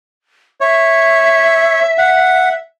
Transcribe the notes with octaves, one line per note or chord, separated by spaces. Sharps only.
C#5 E5
F#5